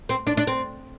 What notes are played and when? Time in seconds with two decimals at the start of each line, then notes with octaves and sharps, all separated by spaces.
0.09 C4
0.27 D4
0.37 D4
0.47 C4